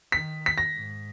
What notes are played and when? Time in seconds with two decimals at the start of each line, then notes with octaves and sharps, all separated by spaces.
0.12 D#3 B6
0.46 B6
0.58 A#6
0.73 G#2